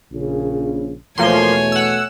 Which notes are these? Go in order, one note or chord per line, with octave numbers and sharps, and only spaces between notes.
A#1 C#3
E2 B2 F3 A3 A#3 C#5 G#5 C6
F#5 E6